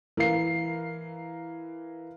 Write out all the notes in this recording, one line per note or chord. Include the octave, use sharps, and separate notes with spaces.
E3 A#4 F5 C7